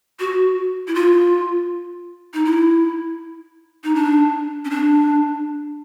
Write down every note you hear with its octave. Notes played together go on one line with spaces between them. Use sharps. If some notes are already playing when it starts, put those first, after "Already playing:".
F#4
E4
F4
D#4
E4
D#4
D4
C#4
D4